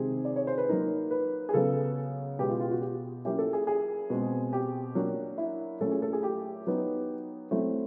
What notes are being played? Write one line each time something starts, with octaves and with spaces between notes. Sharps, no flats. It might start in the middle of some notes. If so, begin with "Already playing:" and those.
Already playing: C3 D#3 G#3 C4 G#4
D5
C#5
C5
B4
F#3 A#3 D#4 A#4
B4
G#4
C#3 F#3 B3 A4
B2 G#3 B3 G4
F4
F4
F#4
G4
F#3 A#3 C#4 E4 G4
A4
G#4
G#4
B2 G#3 C4
G4
F#3 A#3 D4 F#4
E4
A#2 F#3 A3 C#4 E4 A4
G#4
A4
G#4
G4
F#3 B3 D#4
F#3 A3 C4 E4